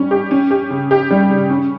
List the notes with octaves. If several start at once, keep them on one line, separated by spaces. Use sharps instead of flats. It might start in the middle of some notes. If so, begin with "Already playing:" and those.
Already playing: G3 C#4
G4
C#4
G4
C#3
G4
G3
C#3
C#4